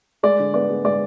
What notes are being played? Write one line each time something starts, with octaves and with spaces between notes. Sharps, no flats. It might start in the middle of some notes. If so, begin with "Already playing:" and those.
G#3 D5
D3
B3 D5
G#3
G#3 D5